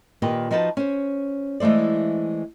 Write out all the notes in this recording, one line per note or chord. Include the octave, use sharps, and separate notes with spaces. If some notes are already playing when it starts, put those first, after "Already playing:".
A#2 D#3 G4 B4
F3 D#4 F#4 B4 A5
C#4 C5
E3 G#3 A3 C5 D5